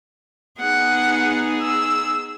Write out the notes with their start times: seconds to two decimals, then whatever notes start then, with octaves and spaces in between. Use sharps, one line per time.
0.61 B3 D#4 G#4 F#5
1.62 E6